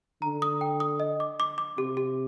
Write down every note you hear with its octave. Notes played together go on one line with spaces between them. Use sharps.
D3 A#5
D#6
G5
D#6
D#5
D6
D6
D6
C3 G4
G4